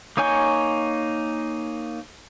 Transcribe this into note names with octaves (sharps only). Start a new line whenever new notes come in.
A#3 D#4 C#5 G#5 G6